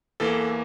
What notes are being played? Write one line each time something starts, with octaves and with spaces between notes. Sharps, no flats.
E2 E3 A#3 A4